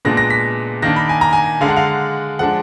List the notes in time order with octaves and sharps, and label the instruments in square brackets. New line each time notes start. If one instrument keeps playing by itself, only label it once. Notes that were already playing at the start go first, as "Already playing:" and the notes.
[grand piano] A#2 G#3 B3 D4 A#6
A#6
B6
D#3 A#3 D4 A#6
B5
G#5
A#5
G#5
D3 G#3 D4 F5
F#5
F5
F3 G#3 D4 F#5